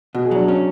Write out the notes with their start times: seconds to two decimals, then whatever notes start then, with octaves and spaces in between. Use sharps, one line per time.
0.15 B2 F#4
0.25 G#4
0.31 F#3 D4 F#4
0.48 C#4